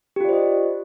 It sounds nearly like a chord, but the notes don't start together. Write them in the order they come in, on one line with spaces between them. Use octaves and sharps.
G4 F4 D5 C5 D#5